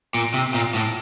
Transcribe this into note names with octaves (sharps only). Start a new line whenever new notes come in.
A#2
C3
A#2
A2